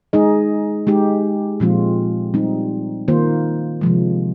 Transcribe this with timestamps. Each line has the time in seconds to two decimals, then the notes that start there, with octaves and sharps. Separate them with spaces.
0.13 G#3 D#4 G#4 D#5
0.87 G#3 D#4 G4
1.60 A#2 F3 G#3 C4 F4
2.34 G3 C4 D#4
3.08 D#3 A#3 F4 C5
3.81 C3 F3 G#3